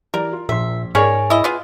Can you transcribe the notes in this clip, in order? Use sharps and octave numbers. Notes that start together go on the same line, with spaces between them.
E3 G4 A#4 D5
F4
A#1 A#2 E5 C6
G#2 C#4 G#4 A#4 C#5 D5 F6
E4 D#5
B3 F4 G#4